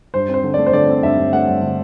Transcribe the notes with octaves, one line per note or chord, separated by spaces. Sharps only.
G2 C5
C4
C5
D3
A3 D5
C5
D3 D5
C4
G2 E5
G2
A3 F#5
G2
D3